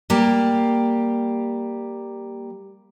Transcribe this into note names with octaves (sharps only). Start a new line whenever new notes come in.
G3 A#3 G4